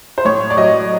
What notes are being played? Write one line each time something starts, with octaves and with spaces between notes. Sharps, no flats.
C5
A2 C#5
D5
F#3 D#5